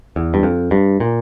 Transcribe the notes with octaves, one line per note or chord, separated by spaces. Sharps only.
E2
G2
F2
G2
A#2